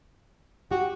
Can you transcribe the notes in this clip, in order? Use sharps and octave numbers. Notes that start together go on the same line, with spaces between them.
F#4 G4